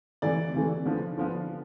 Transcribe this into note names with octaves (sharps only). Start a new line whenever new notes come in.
C3 E3 A3 D5
C3 E3 A3
D3 F3 B3
D3 F3 B3